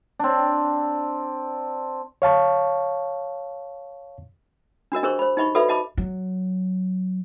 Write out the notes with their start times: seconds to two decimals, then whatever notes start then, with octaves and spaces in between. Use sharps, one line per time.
0.19 C4 D4
2.22 C#5 F5 A5 C#6
4.92 D4 F#4 A#4 D#5
5.03 D4 G4 G#4 A#4 C5 C#6
5.19 C5 B5
5.37 D#4 G4 D#5 B5 C#6
5.55 F#4 A4 B4 D5 E5 B5
5.69 F#4 D#5 A5 B5 D6
5.98 F#3